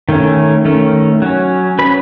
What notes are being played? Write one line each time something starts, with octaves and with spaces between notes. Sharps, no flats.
D#3 A3 C#4
D#3 A3 C#4
F#3 C#4
F#3 C#4 B4 B5